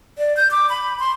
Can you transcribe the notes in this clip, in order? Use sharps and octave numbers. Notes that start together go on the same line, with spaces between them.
D5
G6
D6
B5
C6